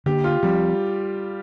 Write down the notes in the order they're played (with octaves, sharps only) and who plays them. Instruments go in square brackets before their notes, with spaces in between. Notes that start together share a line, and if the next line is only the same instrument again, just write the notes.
[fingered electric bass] D3 A#3 D4 [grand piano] G4
[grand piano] F4
[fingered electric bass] F3 C4 [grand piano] G3